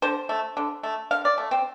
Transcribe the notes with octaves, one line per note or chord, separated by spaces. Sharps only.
D3 C5
A3
D3
A3
D3 F5
D5
A3
C4